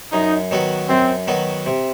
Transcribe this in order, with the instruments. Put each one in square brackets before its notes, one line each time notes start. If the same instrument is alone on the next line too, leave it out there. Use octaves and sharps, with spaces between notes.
[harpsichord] F#2 [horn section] D#4
[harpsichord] D#3 F#3 B3 F#4
[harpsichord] F#2 [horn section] C4
[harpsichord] D#3 F#3 B3 F#4
C3